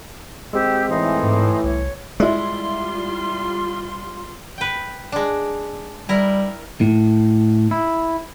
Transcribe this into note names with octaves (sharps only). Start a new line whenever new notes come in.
G#3 C4 G4 E6
A2 E3 D#4 C6
G#2
C2 C#5
G3 G#3 E4 F4 D5 C6
B4 G5
G#3 D4
G3 E4 A#4
A2
E4